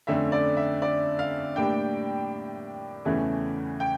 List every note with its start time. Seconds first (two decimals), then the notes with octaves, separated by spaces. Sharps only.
0.07 F2 D3 A3 C#4 E5
0.32 D5
0.57 E5
0.82 D5
1.19 F5
1.56 A2 G3 A#3 D4 G5
3.05 E2 C#3 E3 A3 C#4
3.80 G5